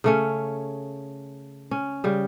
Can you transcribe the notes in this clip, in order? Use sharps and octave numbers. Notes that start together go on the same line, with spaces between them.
C#3 A3 C#4
C#4
C#3 G3